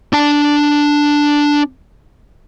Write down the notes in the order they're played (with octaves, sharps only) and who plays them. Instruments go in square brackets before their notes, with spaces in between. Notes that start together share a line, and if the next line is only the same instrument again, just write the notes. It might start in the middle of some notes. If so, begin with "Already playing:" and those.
[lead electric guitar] D4 A5